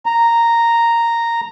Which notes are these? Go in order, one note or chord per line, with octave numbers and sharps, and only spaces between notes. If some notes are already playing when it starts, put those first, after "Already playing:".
A#5